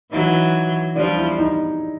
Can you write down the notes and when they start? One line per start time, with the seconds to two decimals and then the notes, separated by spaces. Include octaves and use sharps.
0.12 E3 F#3 D#4
0.95 F3 G3 D4
1.17 E4
1.38 D#4